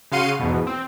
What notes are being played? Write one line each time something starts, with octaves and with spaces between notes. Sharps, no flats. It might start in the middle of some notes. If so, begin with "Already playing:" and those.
C#3 F#4 F5 C6 C#7 D#7
E2 G#2 B2
C4